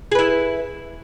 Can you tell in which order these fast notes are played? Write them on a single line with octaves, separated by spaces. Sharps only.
G#4 B4 E4